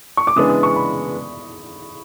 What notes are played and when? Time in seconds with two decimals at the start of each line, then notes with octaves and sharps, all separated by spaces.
0.17 C#6
0.27 D6
0.36 C#3 E3 G#3 B3 D4 D#6
0.49 D#6
0.63 C#6
0.76 B5